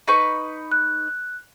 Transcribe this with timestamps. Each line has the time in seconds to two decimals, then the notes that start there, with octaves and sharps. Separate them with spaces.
0.08 D#4 B4 C#6
0.72 F#6